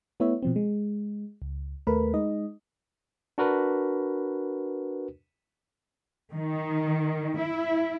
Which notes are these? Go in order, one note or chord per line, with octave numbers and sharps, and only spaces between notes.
A3 B3 E4 C#5 E5
B2 F3 C4
G#3
C#2
D#2 A3 A#4 B4 B5
G#3 D#4 D#5
D4 F#4 A#4 B4
D#3
E4